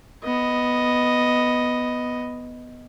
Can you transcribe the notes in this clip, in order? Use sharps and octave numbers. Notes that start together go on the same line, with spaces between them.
B3 D#5